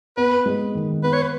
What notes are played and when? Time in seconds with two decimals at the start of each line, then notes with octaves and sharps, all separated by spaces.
0.17 B3 B4
0.46 G#3
0.75 D#3
1.03 B3 B4
1.13 C#5
1.22 B4